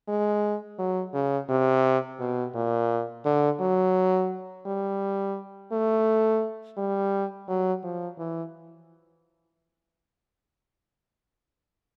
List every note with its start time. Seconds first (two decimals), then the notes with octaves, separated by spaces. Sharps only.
0.08 G#3
0.79 F#3
1.14 C#3
1.49 C3
2.20 B2
2.55 A#2
3.25 D3
3.60 F#3
4.66 G3
5.72 A3
6.77 G3
7.48 F#3
7.83 F3
8.18 E3